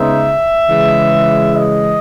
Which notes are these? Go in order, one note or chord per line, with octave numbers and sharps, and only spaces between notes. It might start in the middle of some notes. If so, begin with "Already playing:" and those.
Already playing: C#3 G#3 B3 D#4 E5
C#3 E3 G#3
D#5